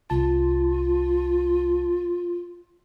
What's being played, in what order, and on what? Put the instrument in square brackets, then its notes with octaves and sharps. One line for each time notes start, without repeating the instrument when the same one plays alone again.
[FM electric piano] C2 A5 [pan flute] F4